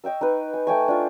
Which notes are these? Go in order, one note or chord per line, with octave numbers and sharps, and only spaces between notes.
D#5 G5 C#6 E6
D#4 B4
G#5
A3 G5 G#5 C#6
D4 F4